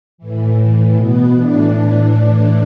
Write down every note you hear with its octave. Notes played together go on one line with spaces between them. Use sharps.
A2 E3
A2 E3
B2 B3
A2 E3 D4
A2 E3 D4
A2 E3 D4